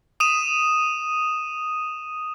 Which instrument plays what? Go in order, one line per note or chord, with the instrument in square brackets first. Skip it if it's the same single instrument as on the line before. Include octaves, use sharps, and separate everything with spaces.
[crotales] D#6 D#7 E7